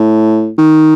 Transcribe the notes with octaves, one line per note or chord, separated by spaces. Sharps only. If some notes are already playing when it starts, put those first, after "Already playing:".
Already playing: A2
D#3